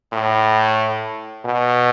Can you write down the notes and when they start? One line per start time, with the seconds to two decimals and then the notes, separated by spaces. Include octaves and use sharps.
0.12 A2
1.45 B2